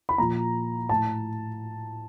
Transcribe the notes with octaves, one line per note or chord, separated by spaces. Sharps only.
B5
A#2 F3 A#5
A2 A5